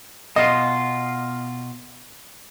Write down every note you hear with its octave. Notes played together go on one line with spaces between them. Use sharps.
B2 F4 D#5